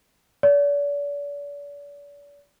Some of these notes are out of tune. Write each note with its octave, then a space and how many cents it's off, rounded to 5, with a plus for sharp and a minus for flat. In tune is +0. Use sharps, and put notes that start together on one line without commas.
D5 -40